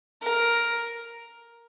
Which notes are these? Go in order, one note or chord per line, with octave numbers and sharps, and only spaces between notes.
A#4